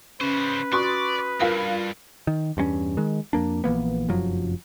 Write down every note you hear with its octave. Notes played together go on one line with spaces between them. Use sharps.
C#3 C#4 B4 C5
F#4 D5 C6 C#6 D#6
C2 G2 F4 A#4 F5 B5
D#3
E2 G2 B3 C#4
D#3 G#3
F2 A#3 D4
A#1 E3 A#3 B3
F1 F#2 F3 F#3